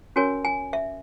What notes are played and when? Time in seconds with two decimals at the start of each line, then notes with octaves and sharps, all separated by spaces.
0.16 C#4 F#4 A#4 C#5 G#5
0.45 G#5
0.73 E5